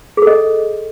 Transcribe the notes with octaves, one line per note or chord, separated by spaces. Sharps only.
G#4 A4 D#5